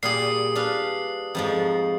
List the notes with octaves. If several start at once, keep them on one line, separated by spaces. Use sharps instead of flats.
A#2 G3 G#4 D#6 C7
D4 B4 F5
F2 G#2 F3